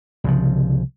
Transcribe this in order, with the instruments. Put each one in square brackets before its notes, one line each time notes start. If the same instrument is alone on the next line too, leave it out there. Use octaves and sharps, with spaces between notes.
[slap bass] C2 C#3 F3